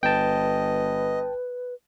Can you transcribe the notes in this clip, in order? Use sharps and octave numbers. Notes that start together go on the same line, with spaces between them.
G1 B4 D#5 G5 A5